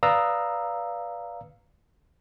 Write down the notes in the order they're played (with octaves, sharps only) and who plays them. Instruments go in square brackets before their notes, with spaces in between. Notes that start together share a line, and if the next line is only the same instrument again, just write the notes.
[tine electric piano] B4 D5 F5 A#5 D#6 E6